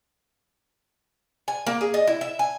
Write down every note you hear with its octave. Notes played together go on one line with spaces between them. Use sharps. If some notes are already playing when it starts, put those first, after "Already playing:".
G#5
A#3
G#4
D#5
E4
E5
G#5